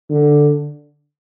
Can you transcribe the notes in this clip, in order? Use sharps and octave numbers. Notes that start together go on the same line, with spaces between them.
D3